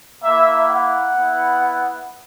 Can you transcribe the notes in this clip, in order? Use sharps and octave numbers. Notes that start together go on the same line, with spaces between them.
A#3 E4 E5
F#5
B3 E4